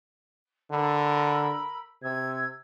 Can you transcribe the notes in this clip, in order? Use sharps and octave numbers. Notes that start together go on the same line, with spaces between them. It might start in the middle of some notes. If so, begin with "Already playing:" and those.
D3 A#4 B5 E6
C3 E6 G#6